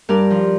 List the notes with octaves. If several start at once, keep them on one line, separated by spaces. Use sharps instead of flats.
G2 A#4 D5
F3